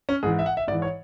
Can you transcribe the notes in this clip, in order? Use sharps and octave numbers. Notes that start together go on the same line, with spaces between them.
C#4
G#2 E3 G#4
E5
F#5
E5
G#2 E3 D5
C#5